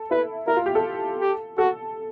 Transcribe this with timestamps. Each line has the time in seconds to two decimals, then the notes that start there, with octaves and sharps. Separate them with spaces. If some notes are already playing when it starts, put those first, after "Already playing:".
Already playing: A4
0.11 E4 B4
0.47 E4 A#4
0.56 F4
0.66 G4
0.75 A4
1.21 G4
1.58 F#4 A4